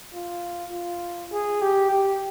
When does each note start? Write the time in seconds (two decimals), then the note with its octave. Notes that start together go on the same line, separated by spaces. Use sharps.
0.14 F4
0.73 F4
1.32 G#4
1.62 G4
1.91 G4